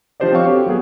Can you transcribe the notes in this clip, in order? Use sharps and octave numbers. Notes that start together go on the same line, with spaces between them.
F3 D4 G4 C5 D5 D#5
C4 G4 C#5 F5 C#6
F#4 G4 A4
F#3 B3 G#4